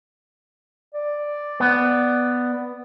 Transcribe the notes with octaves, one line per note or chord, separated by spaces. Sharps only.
D5
B3